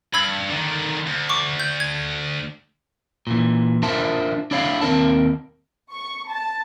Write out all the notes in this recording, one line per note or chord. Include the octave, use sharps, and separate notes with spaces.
G2 B5 E6 G#6
D3 D#3
D2
C#6 D6
G6
G#6
A#2 E3
D4 F4 A#4 C5 E5 A5
D4 E4 C#5 F5
D#2 C4 A#4 A5
C#6
A5